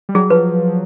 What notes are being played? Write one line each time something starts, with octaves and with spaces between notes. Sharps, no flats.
G3
F#3 G#4
F3 B4